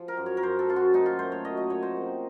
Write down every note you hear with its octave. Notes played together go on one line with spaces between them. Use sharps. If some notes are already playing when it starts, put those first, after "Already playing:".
Already playing: F3
A#4
F#2
C#5
A#4
F#2 C5
A4
F#2 F4
F#4
A#2 D#4
F4
A3 C5
C#5
F#3 D#5
D#5
A#2 C#5
C5
C3